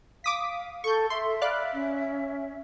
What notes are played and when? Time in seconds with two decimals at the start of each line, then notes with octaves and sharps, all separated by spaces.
0.24 F5 D6 D#6 B6
0.84 A4 C#6 G6
1.10 A4 E5 C6
1.41 D5 F5 B5 F#6
1.73 C#4